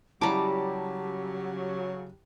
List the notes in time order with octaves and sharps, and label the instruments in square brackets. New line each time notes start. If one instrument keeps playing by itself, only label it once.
[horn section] C#3 F#3 [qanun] G3 D6 [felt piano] E4 A5 A#5 [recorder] G4